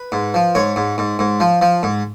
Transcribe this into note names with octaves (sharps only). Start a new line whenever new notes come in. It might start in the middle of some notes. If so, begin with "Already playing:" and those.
Already playing: B4
G#2
F3
G#2 C#5
G#2
G#2
G#2
F3
F3
G#2